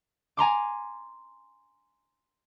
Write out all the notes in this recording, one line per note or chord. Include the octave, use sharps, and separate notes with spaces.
G#5 A#5 C6 D6